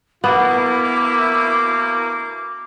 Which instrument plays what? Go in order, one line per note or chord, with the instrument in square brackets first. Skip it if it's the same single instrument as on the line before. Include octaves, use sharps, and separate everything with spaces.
[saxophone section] D2 B2 A#3 [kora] B3 [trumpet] E4 [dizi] D6